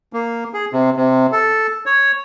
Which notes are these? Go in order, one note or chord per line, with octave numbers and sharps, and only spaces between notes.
A#3
G#4
C3
C3
A4
C#5